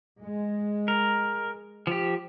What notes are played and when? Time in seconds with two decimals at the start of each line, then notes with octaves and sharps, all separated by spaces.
0.21 G#3
0.88 A#4
1.87 F3 G4